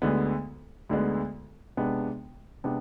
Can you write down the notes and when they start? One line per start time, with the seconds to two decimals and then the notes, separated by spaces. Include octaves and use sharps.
0.02 D2 D3 G#3 B3
0.89 D2 D3 G#3 B3
1.77 C3 G#3 B3 D4
2.64 C3 G#3 B3 D4